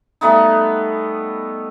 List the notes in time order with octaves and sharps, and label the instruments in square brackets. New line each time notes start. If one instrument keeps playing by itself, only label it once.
[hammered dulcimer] G3 A3 B3 D#4